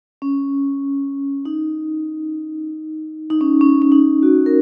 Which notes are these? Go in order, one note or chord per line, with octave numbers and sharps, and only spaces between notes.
C#4
D#4
D#4
C#4
C#4
C#4
D#4
F#4
A#4